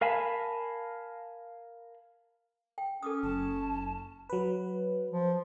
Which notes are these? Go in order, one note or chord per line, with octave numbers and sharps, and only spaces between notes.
A#4 F5 G#5 A5 B5
G5
C#4 A4 D6 D#6
F#1 A5
F#3 B4
F3